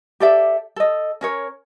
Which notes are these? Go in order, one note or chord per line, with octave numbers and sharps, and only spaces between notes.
G4 A4 D5 E5
A4 D#5
C#4 A#4 C#5